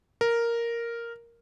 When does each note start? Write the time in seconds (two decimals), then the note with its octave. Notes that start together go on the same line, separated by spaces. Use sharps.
0.21 A#4